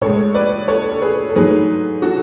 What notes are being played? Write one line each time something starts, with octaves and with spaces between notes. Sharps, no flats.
A2 G#3 A4 C#5
B4 D5
A4 C#5
A4
G#4 B4
A4
G#2 F#3 A3 G#4 B4
F#4 A4